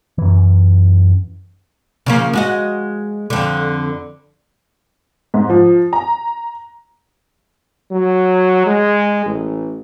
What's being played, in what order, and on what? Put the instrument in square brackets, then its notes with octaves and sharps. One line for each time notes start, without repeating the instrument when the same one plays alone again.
[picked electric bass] F#2 E3
[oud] C#3 F3 A#3
G#3 F#4 D#5
F2 D3
[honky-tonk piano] G#2
F3
A#5
[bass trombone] F#3
G#3
A1